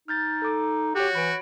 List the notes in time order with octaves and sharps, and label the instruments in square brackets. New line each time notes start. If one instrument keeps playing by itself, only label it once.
[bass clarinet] D#4 [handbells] F6 G6 A6
[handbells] A4 D6
[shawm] F#4 [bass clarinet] G4 [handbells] C#5 G6
[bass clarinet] E3 [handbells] B5 D7